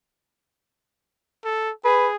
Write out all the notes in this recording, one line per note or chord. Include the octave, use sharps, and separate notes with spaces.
A4
G#4 B4